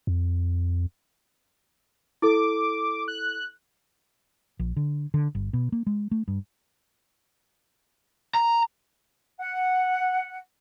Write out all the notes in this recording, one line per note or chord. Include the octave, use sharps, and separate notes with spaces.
F2
E4 A4 D6
F#6
A#1
D3
D3
G1
B2
A#3
G#3
A3
G2
A#5
F#5